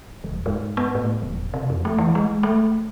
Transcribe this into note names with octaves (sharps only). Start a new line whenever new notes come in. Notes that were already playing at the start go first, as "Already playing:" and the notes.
D#1
G#2
B3
A2
E1
C3
F2
A3
E3
G#3
A3